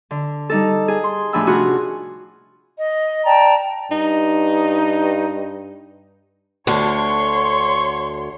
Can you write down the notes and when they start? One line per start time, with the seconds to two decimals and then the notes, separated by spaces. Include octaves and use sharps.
0.11 D3
0.49 G3 D#4 A4
0.88 G#4
1.04 C6
1.33 A2 F3 D4 G#5 B5 E6
1.47 C3 F4 F#4 G#4
2.77 D#5
3.24 D5 G5 A5 A#5
3.91 G2 D#4
6.67 D2 D3 C#5 C6 C#6